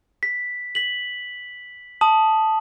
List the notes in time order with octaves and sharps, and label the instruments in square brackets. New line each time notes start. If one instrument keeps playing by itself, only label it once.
[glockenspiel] B6
B6 F#7
A5 D#6 F#7